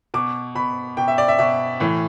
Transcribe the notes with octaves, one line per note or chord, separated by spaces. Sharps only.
B2 D6
B2 B5
B2 G5
E5
D5
E5
B2 E5
A2 E3